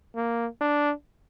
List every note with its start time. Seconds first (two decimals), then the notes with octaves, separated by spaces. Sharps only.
0.15 A#3
0.61 D4